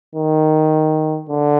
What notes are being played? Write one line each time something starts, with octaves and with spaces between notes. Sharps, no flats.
D#3
D3